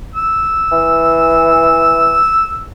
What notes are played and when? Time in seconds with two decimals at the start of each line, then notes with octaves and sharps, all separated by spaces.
0.15 E6
0.72 E3